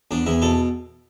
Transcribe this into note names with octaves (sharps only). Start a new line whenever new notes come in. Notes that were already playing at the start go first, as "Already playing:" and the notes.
E2 D4
E2 E4
B2 A4